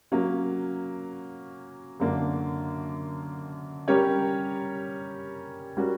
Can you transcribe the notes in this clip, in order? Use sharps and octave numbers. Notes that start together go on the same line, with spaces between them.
F#3 A#3 C#4
F#2 D3 A#3 D4
G3 C#4 G4 A#4 C#5
G3 C#4 F#4 A#4